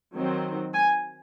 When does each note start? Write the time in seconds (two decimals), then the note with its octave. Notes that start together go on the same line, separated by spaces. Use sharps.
0.14 D#3 F#3 C4
0.74 G#5